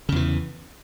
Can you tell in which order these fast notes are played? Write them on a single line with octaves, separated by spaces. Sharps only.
C#3 E2 E3